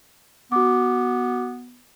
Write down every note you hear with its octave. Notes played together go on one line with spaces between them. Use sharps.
B3 F#4 D6